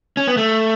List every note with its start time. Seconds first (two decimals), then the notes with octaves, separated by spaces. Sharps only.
0.17 C#4
0.27 B3
0.37 A3